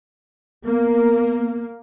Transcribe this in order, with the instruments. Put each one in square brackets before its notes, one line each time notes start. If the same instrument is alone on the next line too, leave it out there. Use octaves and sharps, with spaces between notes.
[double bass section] A#3 [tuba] B3 [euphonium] A#4